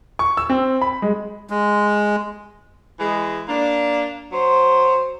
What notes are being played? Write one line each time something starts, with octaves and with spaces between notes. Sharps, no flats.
C#6
E6
C4
B5
G#3
G#3
E3 G#3
A#3 D4
F#3 C5